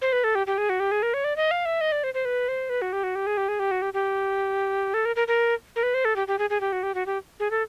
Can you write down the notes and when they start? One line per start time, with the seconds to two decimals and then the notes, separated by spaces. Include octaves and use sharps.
0.02 C5
0.13 B4
0.24 A4
0.35 G4
0.47 G4
0.58 G#4
0.69 F#4
0.80 G4
0.91 G#4
1.03 A#4
1.14 C#5
1.24 D5
1.36 D#5
1.51 F5
1.65 E5
1.81 D#5
1.92 D5
2.04 C5
2.14 C5
2.25 B4
2.48 C5
2.69 B4
2.82 F#4
2.93 G4
3.04 F#4
3.15 G4
3.27 G#4
3.37 G4
3.48 G#4
3.59 G4
3.71 F#4
3.82 G4
3.94 G4
4.94 A4
5.05 A#4
5.16 A#4
5.28 A#4
5.76 A#4
5.83 B4
5.94 C5
6.05 A4
6.16 G4
6.28 G4
6.39 G#4
6.50 G#4
6.61 G4
6.72 F#4
6.83 G4
6.95 F#4
7.06 G4
7.40 G#4
7.51 A4